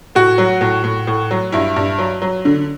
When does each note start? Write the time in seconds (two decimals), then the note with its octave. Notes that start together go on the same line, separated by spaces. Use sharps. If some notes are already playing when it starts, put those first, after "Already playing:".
0.15 A2 F#4
0.38 F#3
0.61 A2
0.84 A2
1.07 A2
1.31 F#3
1.52 G2 E4
1.76 G2
1.99 F#3
2.22 F#3
2.45 D3